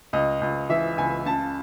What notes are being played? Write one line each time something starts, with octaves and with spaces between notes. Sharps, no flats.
C#2 D#5
C#2
E3 E5
C#2 G#5
C#3 A5